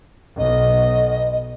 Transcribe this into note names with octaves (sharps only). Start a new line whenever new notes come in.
B1 D#5